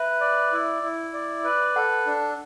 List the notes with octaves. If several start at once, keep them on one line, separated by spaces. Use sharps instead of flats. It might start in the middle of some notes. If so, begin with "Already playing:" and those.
Already playing: B4 E5
D5
E4
E4
D5
B4
A4 F#5
D4